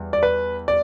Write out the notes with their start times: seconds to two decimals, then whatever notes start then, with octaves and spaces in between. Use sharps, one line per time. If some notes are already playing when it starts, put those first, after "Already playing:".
Already playing: E2 G3
0.13 D5
0.23 B4
0.68 D5